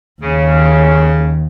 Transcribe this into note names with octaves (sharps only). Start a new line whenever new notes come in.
D#2 C#3